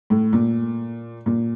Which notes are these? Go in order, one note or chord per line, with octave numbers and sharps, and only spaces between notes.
A2
A#2
A#2